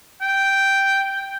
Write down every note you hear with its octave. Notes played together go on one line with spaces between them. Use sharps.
G5